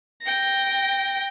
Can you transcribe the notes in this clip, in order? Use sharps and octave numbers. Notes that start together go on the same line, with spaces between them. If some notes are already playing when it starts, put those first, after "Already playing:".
G5 A#6